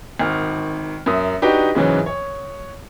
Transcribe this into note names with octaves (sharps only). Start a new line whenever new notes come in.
G#1 D#3 F6
F#2 A#4 E5 D#6
D4 D#4 F#4 G4 B4 D#5
G#2 C#3 E3 F#3
C#5